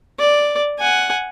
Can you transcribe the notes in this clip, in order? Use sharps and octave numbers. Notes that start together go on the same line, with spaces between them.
D5
F#5 G#5